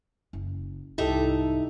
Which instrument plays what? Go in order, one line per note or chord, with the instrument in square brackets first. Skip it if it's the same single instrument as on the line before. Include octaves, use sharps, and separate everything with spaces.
[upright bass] F#1
[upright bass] C2 G#2 [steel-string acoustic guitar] D#4 E5 [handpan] E4 G4 A4